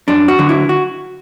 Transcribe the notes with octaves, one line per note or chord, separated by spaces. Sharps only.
F#2 D4
F#4
D3 F#3
E4
F#4